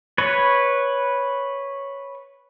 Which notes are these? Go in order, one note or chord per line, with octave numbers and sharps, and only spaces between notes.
B4 C#5